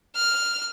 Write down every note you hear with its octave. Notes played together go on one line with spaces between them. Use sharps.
F6